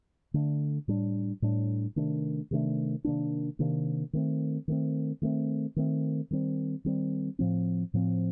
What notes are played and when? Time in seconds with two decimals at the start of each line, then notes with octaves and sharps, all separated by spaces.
0.34 D3 A3 D4
0.88 A2 G3 D4
1.42 A2 G3 D4
1.96 C3 D#3 A3 D4
2.51 C3 D#3 A3 D4
3.04 C3 D#3 A#3 D4
3.59 C3 D#3 A#3 D4
4.13 D#3 A3 C4
4.68 D#3 A3 C4
5.22 D#3 A3 C4
5.76 D#3 A3 C4
6.31 D#3 G3 C4
6.85 D#3 G3 C4
7.39 A2 F3 C4
7.94 A2 F3 C4